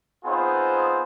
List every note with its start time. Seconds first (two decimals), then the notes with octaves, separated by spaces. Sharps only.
0.25 B3 C4 D#4 F4 G#4 C5